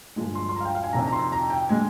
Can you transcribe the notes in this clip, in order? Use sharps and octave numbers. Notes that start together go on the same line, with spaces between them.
G2 D3 F3 G#3 G#5
C6
C6
A#5
F5
G5
F5
G#5
F2 C3 D#3 A#5
A#5
C6
A#5
G5
D3 G#3 G#5